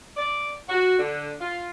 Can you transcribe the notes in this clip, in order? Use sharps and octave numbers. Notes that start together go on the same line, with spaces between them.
D5
F#4
D3
F4